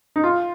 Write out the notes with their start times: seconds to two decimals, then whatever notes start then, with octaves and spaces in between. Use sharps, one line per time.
0.16 D#4
0.24 F4